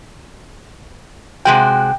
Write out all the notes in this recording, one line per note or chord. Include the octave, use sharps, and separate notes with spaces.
C3 G#3 F#4 G5